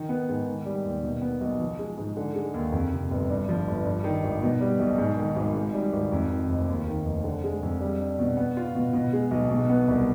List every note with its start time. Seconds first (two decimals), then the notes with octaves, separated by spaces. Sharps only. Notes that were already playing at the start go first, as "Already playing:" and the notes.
Already playing: D#3
0.09 B3
0.29 G#2
0.47 D#3
0.65 G3
0.84 D#2
1.03 B2
1.22 B3
1.41 B1
1.59 F3
1.79 G#3
1.98 G#2
2.17 D3
2.35 G#3
2.54 D#2
2.72 F2
2.92 C3
3.11 G1
3.30 G2
3.49 F3
3.68 G1
3.85 G2
4.04 D#3
4.24 G#1
4.42 B2
4.60 G3
4.79 B1
4.98 G#2
5.17 D#3
5.36 G#1
5.55 G#2
5.73 G3
5.93 G#1
6.12 F2
6.30 D#3
6.49 F1
6.68 D#2
6.88 D#3
7.05 F1
7.24 D3
7.44 G#3
7.63 F2
7.80 G3
7.99 D4
8.19 B2
8.37 B3
8.57 F4
8.75 B2
8.93 B2
9.13 G#3
9.31 B1
9.50 B2
9.69 B3
9.88 C2